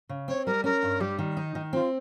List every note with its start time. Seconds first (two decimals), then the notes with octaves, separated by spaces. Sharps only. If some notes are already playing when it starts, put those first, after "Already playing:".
0.09 C#3
0.28 C4 C#5
0.46 G3 A#4
0.64 C#4 A#4
0.83 G2
1.00 G3 G4
1.19 D#3
1.37 D#4
1.55 D#3
1.73 C4 F4